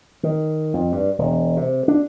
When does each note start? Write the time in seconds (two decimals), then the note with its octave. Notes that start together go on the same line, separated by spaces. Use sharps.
0.23 D#3
0.74 F2
0.92 G2
1.18 E1
1.57 C3
1.88 D4